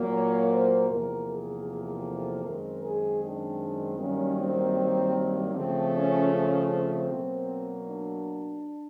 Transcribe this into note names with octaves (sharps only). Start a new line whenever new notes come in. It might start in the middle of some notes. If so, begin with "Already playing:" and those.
Already playing: A#2 F#3 A#3
C#5
C5
E2 C3 F3 A#3 A#4
G#4
A4
F#2 D#3 G#3 C4 A#4
G#4
D4
G2 D#3 F#3 A#3 C#4
C4
C#3 F3 A3 C4
C#4
C#4
C4
B2 F#3 A#3
D4